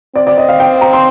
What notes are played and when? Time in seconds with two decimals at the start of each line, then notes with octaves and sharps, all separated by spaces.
0.15 C4 D5
0.27 D5
0.38 D#5
0.49 F5
0.60 G5
0.81 A#5
0.93 C6